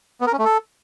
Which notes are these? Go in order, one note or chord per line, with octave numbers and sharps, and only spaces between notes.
B3
A#4
C#4
A3
A4